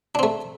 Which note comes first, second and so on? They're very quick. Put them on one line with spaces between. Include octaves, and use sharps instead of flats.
D4 C4 A3